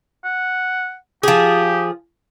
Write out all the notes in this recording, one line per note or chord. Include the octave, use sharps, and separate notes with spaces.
F#5
F3 G4 G#4